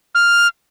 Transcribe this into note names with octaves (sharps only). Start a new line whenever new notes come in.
F6